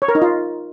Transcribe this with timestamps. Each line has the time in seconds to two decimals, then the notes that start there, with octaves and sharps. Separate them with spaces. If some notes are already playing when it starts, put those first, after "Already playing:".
0.02 C#5
0.08 A#4
0.15 D#4
0.22 F4